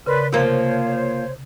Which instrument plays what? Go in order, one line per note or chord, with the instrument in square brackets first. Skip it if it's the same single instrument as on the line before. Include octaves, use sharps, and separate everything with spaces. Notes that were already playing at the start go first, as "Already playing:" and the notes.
[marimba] C#3 A#4 [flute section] B4 D5 C6
[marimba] C3 [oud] F3 A#3 [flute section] C5 C#5